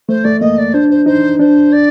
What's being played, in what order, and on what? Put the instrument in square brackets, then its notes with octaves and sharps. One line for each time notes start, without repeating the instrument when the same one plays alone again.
[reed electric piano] A3 [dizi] C5
[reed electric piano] A3 [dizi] D5
[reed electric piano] A#3 [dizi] D#5
[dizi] D5
[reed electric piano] D4 [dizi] C5
[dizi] C5
[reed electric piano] D#4 [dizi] C5
[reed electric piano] D4 [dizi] C5
[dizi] D5